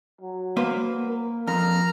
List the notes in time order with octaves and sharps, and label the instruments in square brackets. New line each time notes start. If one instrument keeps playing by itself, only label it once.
[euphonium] F#3
[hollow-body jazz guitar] A#3 B4 C5
[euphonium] A#4
[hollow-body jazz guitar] F2 [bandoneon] A#5 F6